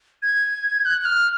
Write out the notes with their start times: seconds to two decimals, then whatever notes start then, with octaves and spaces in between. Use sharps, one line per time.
0.22 G#6
0.85 F#6
1.01 F#6
1.05 F6